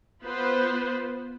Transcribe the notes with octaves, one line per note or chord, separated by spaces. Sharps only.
B3 F4 B4 C5